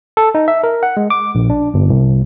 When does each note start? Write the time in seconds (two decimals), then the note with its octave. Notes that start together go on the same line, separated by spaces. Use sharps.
0.17 A4
0.35 D#4
0.48 E5
0.64 A#4
0.83 F#5
0.97 G#3
1.10 D6
1.35 A#1
1.50 D4
1.74 G1
1.90 C2